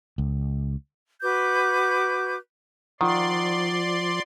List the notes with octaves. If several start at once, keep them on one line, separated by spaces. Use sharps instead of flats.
C#2
F#4 B4 D6 G6
D#3 F3 F4 D5 F#5 C6